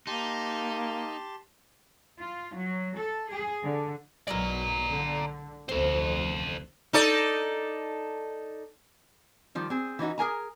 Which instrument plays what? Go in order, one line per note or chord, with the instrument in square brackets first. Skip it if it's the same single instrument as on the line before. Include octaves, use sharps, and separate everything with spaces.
[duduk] A#3 [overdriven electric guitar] D#4 [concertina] G4 A5 C6
[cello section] F4
F#3
A4
G#4
D3
[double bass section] B1 F#3 [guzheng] G#3 E4 A#4 [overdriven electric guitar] D5 A#5
[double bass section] D3
[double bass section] F1 D2 [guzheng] C4 [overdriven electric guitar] A4 C5
[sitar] D#4 A4 D5
[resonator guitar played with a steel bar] D#3 F3 G3
C4 G#4
E3 C#4 D#4 F#4
G#4 A#4 G#5 A#5